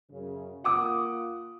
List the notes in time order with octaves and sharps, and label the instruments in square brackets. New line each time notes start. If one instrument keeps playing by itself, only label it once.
[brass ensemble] F#2 C#3
[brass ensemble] A#3 F4 [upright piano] F#5 D6 D#6